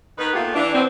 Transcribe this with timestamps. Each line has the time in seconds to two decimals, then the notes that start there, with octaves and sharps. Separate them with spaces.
0.18 D#3 B4
0.33 A#2 A3 B3 F4 G4
0.54 E3 D4
0.73 B2 B3 C4